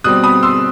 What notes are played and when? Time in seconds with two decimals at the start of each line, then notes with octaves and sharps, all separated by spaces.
0.04 B2 G3 C4 D#6 F#6
0.23 B5 D#6
0.43 C6 E6